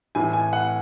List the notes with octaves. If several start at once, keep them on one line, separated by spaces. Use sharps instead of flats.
A2 E3 G#5
G#5
F#5